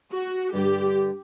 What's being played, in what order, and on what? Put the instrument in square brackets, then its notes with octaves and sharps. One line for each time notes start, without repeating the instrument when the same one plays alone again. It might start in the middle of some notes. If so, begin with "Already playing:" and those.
[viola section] F#4
[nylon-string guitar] G2 D3 G3 [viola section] G4